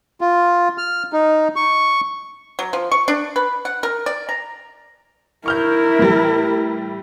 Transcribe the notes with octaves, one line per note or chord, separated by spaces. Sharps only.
F4
F6
D#4
C#6
F#3
F3
C#6
D4
B4
F#5
A#4
D5
A#5
E4 A#4 C#6 F6 G6
A2 E3 G3